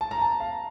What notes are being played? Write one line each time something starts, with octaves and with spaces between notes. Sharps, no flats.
A5
A#5
A5
F5